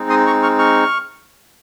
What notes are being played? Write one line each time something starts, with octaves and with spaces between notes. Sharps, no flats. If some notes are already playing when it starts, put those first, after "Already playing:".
Already playing: G#3 C4 D#4
C6 D#6
A#5 C#6
C#6 F6
C#6 F6